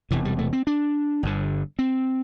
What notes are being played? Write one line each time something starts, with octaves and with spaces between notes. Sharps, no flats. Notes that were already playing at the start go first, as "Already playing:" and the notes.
E1 E2 C3 E3
G3
A3
C4
D4
G1 G2 D3
C4